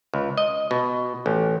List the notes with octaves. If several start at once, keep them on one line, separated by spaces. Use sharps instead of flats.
C#2
D#5
B2
A1